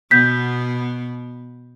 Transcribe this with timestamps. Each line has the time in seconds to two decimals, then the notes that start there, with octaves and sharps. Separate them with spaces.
0.11 B2 B3 G6 B6